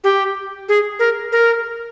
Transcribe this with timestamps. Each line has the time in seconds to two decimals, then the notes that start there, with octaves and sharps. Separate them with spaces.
0.04 G4
0.69 G#4
0.99 A#4
1.32 A#4